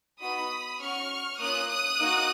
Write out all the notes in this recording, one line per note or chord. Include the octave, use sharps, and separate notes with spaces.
B3 D#4 F#4 B5 D#6
C#4 F#4 C#6 F6
A#3 C#4 F4 D#6 F#6
D#6 F#6
A#3 D#4 F#4